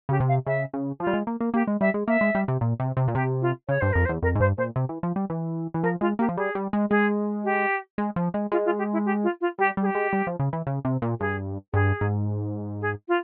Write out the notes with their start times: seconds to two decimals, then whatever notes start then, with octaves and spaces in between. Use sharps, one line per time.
0.09 C#3 G4
0.20 C3
0.28 F5
0.47 C#3 E5
0.73 C#3
1.00 F3 F4
1.07 G3
1.14 G#3
1.27 A#3
1.40 A#3
1.54 A#3 G4
1.67 G#3
1.81 G3 E5
1.94 G#3
2.08 A#3 E5
2.21 G#3
2.35 G3
2.48 C3
2.61 A#2
2.80 C3
2.97 C3
3.08 A#2
3.15 C3 G4
3.42 F4
3.68 C#3 C#5
3.81 G2 C5
3.93 F2 A#4
4.05 C5
4.09 E2
4.22 F2 A#4
4.35 G#2
4.40 G2 C5
4.58 A#2 C5
4.76 C3
4.89 E3
5.03 F3
5.16 G3
5.30 E3
5.74 E3
5.83 F3 A#4
6.01 G#3 F4
6.19 A#3 G4
6.29 F3
6.37 G3 G#4
6.55 G3
6.73 G#3
6.90 G#3 G#4
7.44 G4
7.98 G#3
8.16 F3
8.34 G#3
8.52 G#3 F4
8.65 F4
8.78 G4
8.93 E4
9.06 G4
9.23 F4
9.41 F4
9.59 G3 G4
9.77 G3 G#4
9.86 G4
9.95 G#3
10.13 G3
10.27 F3
10.40 C#3
10.53 E3
10.67 C#3
10.85 C3
11.02 A#2
11.20 G2 G#4
11.74 G2 G#4
12.01 G#2
12.81 G#4
13.08 F4